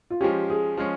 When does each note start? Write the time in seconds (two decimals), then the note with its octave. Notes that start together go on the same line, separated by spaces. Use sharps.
0.10 F4
0.21 F3 G#3 C#4 G4
0.50 G#4
0.77 F3 G#3 C#4